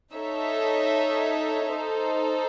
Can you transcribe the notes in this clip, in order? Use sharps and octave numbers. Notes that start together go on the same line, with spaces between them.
D#4 A4 C#5 E5
D#4 A4 C5